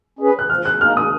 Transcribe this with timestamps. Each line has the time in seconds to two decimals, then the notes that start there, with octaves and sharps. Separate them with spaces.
0.19 C#4 G#4 B4
0.39 F#6
0.50 F3 F6
0.65 F#6
0.81 A#3 D#4 F6
0.97 D#6